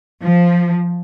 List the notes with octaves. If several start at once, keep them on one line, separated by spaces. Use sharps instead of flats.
F3